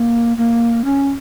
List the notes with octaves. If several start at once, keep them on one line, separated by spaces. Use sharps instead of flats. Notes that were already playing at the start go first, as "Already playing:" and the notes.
Already playing: A#3
A#3
C#4